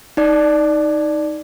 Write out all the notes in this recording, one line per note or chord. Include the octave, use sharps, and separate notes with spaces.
D#4 D5